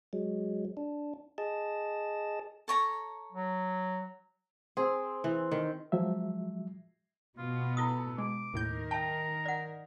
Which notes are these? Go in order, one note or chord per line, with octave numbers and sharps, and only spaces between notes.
F#3 G#3
D4
G#4 D#5 A5
A4 C#5 A#5
F#3
C4 G#4
E3
D#3
F3 F#3 G#3 E5
B2 B3 F4
E4 F4 A4 D#6
G#3 D6
D#2 A2 D#3 A#4 G6
E5 G5 A5 A#5
D5 F#5